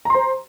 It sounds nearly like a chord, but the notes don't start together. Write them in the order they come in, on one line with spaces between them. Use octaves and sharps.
A#5 C6 C5